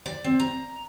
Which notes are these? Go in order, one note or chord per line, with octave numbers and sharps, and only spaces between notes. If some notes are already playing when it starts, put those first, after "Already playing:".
D5
C4
A#5